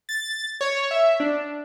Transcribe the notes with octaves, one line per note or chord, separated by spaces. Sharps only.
A6
C#5
E5
D4